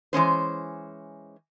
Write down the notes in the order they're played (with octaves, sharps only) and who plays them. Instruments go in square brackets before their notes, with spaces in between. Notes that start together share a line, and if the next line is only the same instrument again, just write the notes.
[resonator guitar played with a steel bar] E3 G#3 C#4 C5